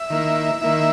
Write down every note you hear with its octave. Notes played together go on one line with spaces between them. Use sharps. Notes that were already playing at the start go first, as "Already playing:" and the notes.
Already playing: E5
D#3 A#3 E4
D#3 A#3 E4